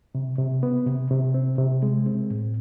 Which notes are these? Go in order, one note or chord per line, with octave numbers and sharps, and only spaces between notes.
C3
C3
B3
C3
C3
C4
C3
G#3
C4
A2